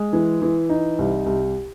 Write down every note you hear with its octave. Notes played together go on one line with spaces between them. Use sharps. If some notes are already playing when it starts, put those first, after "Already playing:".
Already playing: G#3
E3
E3
D#4
C2
C2